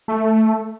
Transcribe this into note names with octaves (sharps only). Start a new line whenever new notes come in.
A3